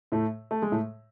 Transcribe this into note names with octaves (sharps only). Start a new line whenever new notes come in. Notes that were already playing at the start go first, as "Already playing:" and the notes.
A2 A3
A3
G#3
A2 A3